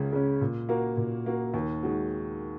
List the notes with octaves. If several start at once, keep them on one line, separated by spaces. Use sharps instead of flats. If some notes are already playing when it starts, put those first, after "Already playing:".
Already playing: C#2 C#3 G#3 C#4
C#3 G#3 C#4
A#2
A#3 F#4 A#4
A#2
A#3 F#4 A#4
D#2
D#3 G#3 F#4